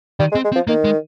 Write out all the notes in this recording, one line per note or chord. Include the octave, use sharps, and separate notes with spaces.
D#3 G3
G#3
C4
G#3
C4
F3
D#3 A#3
G#3